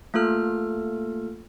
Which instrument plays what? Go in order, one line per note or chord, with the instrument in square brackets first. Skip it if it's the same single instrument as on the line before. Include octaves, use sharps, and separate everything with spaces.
[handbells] A3 A#3 F4 A4 F6